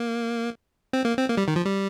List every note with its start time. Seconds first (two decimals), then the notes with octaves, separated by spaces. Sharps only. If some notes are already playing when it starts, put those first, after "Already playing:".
Already playing: A#3
0.93 C4
1.05 A#3
1.17 C4
1.29 A#3
1.37 G3
1.48 D#3
1.56 F3
1.65 G3